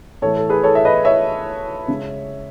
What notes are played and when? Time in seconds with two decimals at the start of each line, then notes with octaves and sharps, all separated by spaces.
0.22 A2 E3 A3 A4 C#5
0.37 A4
0.49 G#4 B4
0.64 A4 C#5
0.75 E5
0.85 B4 D#5
1.05 C#5 E5
1.88 C#3 G#3